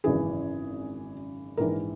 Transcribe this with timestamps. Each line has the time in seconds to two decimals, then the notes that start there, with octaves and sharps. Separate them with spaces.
0.04 G#1 F#2 C#3 E3 G#4
1.57 A#1 G#2 E3 A#4